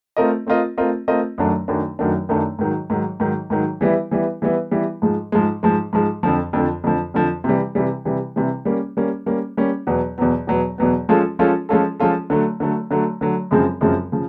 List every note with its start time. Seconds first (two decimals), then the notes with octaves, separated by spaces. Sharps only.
0.17 A3 C4 F4 A#4 D#5
0.47 A3 C4 F4 A#4 D#5
0.78 A3 C4 F4 A#4 D#5
1.08 A3 C4 F4 A#4 D#5
1.38 F#2 D#3 F#3 A3 D4
1.68 F#2 D#3 F#3 A3 D4
1.99 F#2 D#3 F#3 A3 D4
2.29 F#2 D#3 F#3 A3 D4
2.59 G#2 D#3 F#3
2.90 G#2 D#3 F#3
3.20 G#2 D#3 F#3
3.50 G#2 D#3 F#3
3.81 E3 G3 B3 E4
4.11 E3 G3 B3 E4
4.42 E3 G3 B3 E4
4.71 E3 G3 B3 E4
5.02 G#2 F3 G#3
5.32 G#2 F3 G#3
5.63 G#2 F3 G#3
5.93 G#2 F3 G#3
6.23 F2 D3 F3
6.53 F2 D3 F3
6.84 F2 D3 F3
7.14 F2 D3 F3
7.44 C3 E3 G3
7.75 C3 E3 G3
8.05 C3 E3 G3
8.36 C3 E3 G3
8.65 G3 A#3 C#4
8.97 G3 A#3 C#4
9.26 G3 A#3 C#4
9.57 G3 A#3 C#4
9.87 E2 B2 F#3 B3
10.18 E2 B2 F#3 B3
10.47 E2 B2 F#3 B3
10.78 E2 B2 F#3 B3
11.09 F3 G#3 C#4 F4 A4
11.39 F3 G#3 C#4 F4 A4
11.69 F3 G#3 C#4 F4 A4
11.99 F3 G#3 C#4 F4 A4
12.30 D3 F#3 A3
12.60 D3 F#3 A3
12.91 D3 F#3 A3
13.21 D3 F#3 A3
13.51 F#2 C#3 F3 G#3 C4
13.81 F#2 C#3 F3 G#3 C4
14.12 C#3 F3